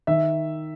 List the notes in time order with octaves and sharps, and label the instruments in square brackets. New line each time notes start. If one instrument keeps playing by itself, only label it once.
[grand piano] D#3 E5